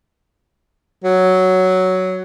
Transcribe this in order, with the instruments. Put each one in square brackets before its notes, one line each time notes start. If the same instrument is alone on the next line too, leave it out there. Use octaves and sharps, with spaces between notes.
[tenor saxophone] F#3